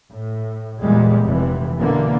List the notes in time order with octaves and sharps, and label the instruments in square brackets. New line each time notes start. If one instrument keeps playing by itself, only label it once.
[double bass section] A2
E2 A#2 G3 G#3
F1 C3 E3
B2 D3 E3 A#3